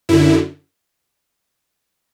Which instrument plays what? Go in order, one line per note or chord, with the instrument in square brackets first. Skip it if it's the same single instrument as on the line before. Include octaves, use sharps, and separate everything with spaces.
[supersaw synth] F#2 D3 E4